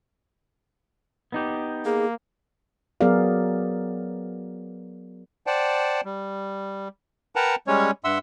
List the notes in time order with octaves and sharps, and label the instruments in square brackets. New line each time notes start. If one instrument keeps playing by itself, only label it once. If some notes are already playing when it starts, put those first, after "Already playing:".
[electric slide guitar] B3 D#4 G4
[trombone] A#3 [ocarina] G#4
[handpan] F#3 B3 G#4 A#4 D5 F5
[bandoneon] C5 D5 F#5 G5 A5
G3
A#4 B4 F#5 G5 A5 A#5
G3 G#3 C#4 C#5
G2 E5 F#5 C6 E6